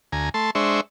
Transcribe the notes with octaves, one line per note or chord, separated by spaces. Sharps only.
D2 G#5 A#5
A3 A5 C6
G#3 D4 C5 E5 C#6